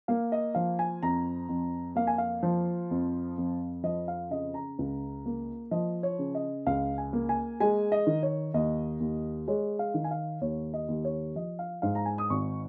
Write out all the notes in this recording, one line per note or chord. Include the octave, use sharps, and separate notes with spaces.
A#3 F5
D#5
F3 F5
G#5
F2 A#5
F2
A#3 F5
G#5
F5
F3
F2
F2
F3 D#5
F5
C#3 D#5
A#5
C#2
A#3
F3 D#5
C#5
C#3
D#5
C#2 F5
G#5
A#3
G#5
G#3 G#5
D#5
D#3
C#5
D#2 D#5
D#2
G#3 C#5
F5
D#3
G#5
F5
D#2 C#5
D#5
D#2
C#5
F3 D#5
F5
G#2 F5
A#5
G#5
D#6
G#1 C#6